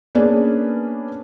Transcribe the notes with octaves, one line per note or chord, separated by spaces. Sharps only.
A#3 B3 C#4 D4 G#4 B4